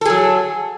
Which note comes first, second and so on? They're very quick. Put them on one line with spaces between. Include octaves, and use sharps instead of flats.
A4 G#4 F#3